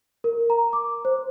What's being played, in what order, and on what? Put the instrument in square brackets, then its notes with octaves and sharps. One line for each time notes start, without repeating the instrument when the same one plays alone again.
[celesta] A#4
A#5
D6
C5